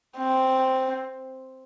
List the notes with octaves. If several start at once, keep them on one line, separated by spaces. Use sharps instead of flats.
C4